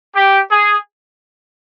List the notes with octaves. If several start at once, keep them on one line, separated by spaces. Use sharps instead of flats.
G4
G#4